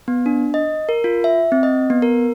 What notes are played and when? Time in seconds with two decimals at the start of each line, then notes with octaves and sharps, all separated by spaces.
0.08 B3
0.26 D4
0.54 D#5
0.89 A#4
1.04 F4
1.24 E5
1.52 C4
1.63 D#5
1.90 B3
2.02 A#4